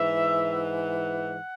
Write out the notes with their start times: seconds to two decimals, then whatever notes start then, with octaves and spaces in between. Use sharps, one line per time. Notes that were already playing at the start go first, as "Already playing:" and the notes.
Already playing: G#2 E3 E5
0.53 F#5